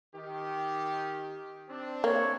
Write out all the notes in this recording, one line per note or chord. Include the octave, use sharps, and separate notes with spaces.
D#3 G4
C4 D4
A#3 C#5